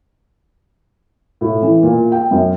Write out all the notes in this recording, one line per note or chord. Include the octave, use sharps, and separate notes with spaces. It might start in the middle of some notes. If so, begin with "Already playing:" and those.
A2
E3
A#2
G5
F#2